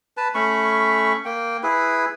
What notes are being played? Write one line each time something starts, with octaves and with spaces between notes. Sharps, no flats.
B4 A5
A3 C#4 B5 C#6
A#3 G5
E4 G#4 B4